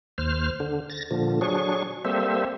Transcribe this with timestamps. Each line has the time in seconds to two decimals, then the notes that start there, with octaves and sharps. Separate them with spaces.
0.18 D#2 C5 F6
0.60 D3
0.90 A6 A#6
1.11 A#2 D3 F3
1.41 F#3 D4 G#4 C#6
2.05 G3 A#3 C4 A4 C5 E5